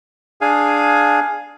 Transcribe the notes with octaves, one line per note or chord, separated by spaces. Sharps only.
D4 G#4 F5 G#5